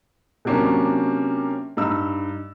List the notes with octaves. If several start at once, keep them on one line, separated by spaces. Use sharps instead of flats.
C3 F#3 A#3 C#4 D4
G2 D#4 B5 E6